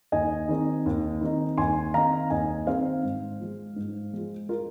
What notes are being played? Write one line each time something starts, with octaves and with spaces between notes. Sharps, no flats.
D#2 D#5 G#5
D#3 C4 D#4
D#2
D#3 C4 D#4
D#2 G#5 C6
D#3 C4 D#4 F5 A#5
D#2 D#5 G#5
D#3 C4 D#4 C5 F5
G#2
F3 G#3
G#2
F3 G#3
F4 A#4